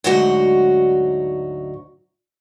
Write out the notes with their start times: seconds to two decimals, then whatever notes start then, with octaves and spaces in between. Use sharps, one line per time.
0.04 D2 G#2 F#3 D#4 F#4